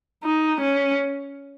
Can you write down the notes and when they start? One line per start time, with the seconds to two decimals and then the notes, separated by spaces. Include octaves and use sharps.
0.24 D#4
0.61 C#4